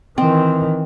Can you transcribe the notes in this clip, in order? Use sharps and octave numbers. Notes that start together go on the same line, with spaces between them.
D#3 E3 C4